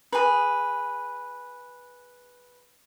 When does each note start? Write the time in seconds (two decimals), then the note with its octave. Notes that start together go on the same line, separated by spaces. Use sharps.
0.12 G#4 B4